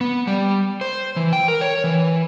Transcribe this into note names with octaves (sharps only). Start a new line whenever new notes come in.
B3
G3
C5
E3
G5
A#4
C#5
E3